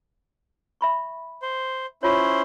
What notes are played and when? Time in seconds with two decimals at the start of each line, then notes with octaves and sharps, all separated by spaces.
0.81 E5 B5 C#6
1.42 C5
2.03 C#4 E4 F4 C5 C#5